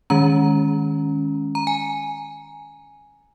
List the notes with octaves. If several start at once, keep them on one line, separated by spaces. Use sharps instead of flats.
D#3 G#3 C#4 A#5
A#5
G#5